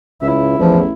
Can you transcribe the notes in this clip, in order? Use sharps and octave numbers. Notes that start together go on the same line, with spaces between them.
C#2 C#3 E4
A1 E2 F3